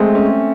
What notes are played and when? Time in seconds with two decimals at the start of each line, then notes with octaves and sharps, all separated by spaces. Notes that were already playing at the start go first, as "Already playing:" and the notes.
Already playing: G#3 A3 C4
0.15 C#4